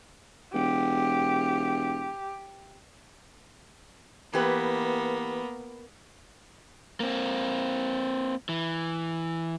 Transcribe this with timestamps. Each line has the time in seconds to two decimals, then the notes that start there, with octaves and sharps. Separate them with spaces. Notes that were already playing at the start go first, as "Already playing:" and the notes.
0.54 E1 G4
4.33 E3 A#3 B3 G4 B4
7.00 A#3 C4
8.49 E3